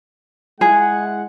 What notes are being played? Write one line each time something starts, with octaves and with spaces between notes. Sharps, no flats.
G#3 E4 G#4 F#5